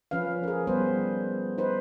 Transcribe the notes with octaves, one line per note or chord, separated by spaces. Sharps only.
F3 C#4 B4 F5
G#4 A#4
G3 B3 B4 C5
D#4 B4 C5